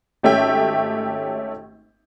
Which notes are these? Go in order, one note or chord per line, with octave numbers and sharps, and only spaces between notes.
G#1 A3 C#4 G4 E5 G5